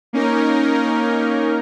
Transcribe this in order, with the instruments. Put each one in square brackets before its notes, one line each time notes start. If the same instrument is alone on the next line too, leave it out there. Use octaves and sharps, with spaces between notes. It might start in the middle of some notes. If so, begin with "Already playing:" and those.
[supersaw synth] A#3 C#4 D#4 A#4